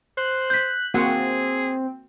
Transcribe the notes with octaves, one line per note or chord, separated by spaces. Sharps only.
C5 F#6
F#6 G6 B6
A#3 C4 F#4 G#4 F#5